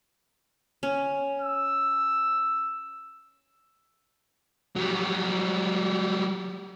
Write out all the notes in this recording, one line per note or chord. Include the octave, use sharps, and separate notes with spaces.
C#4
E6
F#3 G3